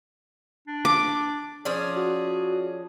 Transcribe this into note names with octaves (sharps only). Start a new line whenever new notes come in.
D4
D6
F3 C#4 G#4 D5
F#4